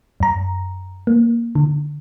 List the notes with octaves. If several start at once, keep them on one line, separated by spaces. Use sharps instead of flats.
F#2 A#5
A#3
D3